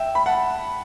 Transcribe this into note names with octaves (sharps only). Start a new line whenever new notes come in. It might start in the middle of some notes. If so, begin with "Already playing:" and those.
Already playing: E5 G5
B5
F#5 A5